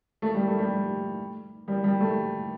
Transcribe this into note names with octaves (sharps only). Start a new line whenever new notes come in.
A3
G3
A3
G3
G3
G3
A3